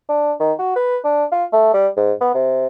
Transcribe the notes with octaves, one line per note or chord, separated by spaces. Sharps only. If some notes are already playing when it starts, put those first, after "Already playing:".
D4
D#3
F#4
B4
D4
F4
A3
G3
G#2
B3
C3